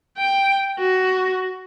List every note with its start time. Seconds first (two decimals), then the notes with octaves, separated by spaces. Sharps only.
0.18 G5
0.78 F#4